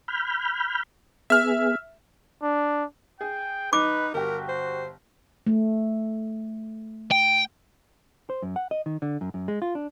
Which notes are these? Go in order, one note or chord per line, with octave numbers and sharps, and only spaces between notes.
B5 F6 G6
B3 G#4 E5 F6
D4
G#4 G5
D#3 D#4 B4 D6
G1 F#4 G4 A#4
C5
A3
G5
C5
F#2
F#5
D#5
D#3
D3
F#2
F#2
G#3
F4
D4